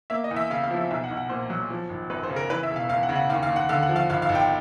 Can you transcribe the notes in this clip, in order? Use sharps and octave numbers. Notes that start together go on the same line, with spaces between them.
A#3 E5
D#5
E2
E5
C#3 F5
F5
F3
E5
B1 E5
F#5
B1
F#5
A#2 C5
F#3
F3
G#1
F#2 B4
C5
C#3
A#4
E3 B4
E5
E1
F5
E2 F5
F#5
C#3
F#5
D#2 F5
F5
D#2
F#5
D3 F5
F#5
F3
F5
G#1 F5
F5
G#1
G5